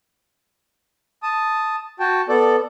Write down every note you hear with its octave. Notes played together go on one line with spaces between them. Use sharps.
A5 D#6
F#4 G5 A5
B3 A4 D5